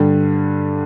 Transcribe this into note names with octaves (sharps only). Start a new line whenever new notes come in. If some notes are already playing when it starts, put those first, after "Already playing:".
Already playing: G2 D3 G3